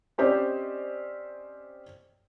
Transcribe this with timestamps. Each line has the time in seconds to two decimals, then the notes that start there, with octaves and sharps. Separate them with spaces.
0.18 C4 C#4 G4 C5 D5 D#5